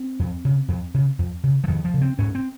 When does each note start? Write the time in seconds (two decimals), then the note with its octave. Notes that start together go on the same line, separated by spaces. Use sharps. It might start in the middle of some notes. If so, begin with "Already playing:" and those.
Already playing: C4
0.19 F2
0.45 C#3
0.68 F2
0.94 C#3
1.19 F2
1.44 C#3
1.64 F3
1.68 F2 D#3
1.85 F3
1.94 C#3
2.02 C4
2.18 G#2 C#4
2.35 C4